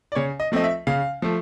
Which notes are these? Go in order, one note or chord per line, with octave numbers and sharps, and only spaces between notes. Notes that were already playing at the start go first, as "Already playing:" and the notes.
D5
C#3 C#5
D#5
F3 A3 C4 D#5
E5
C#3 F5
F3 A3